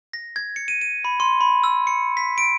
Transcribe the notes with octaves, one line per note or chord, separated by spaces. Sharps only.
A#6
G#6
C#7
D#7
D#7
B5
C6
B5
E6
C#7
B6
D7